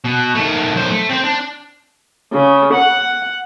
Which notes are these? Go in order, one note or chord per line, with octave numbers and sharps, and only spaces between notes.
B2
D#3 A3
B1 C5
A3
C4 C5
D4
C#3
F#5